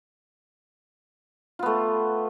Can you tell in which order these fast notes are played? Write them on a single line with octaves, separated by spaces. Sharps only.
F4 B3 A3